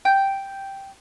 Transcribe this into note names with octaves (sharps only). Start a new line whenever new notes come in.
G5